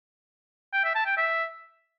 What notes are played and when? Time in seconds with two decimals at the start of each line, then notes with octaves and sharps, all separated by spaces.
0.73 G5
0.84 E5
0.95 A5
1.06 G5
1.17 E5